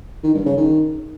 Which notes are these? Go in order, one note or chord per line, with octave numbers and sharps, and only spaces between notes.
D#3
G2
C#3
D#3